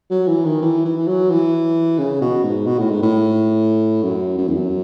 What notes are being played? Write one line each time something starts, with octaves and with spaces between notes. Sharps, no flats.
F#3
E3
D#3
E3
E3
F#3
E3
C#3
B2
G#2
B2
A2
G#2
A2
F#2
F#2
E2
F#2